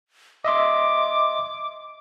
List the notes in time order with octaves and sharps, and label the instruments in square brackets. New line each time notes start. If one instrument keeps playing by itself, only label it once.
[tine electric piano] D#5 E5 C6 [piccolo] D6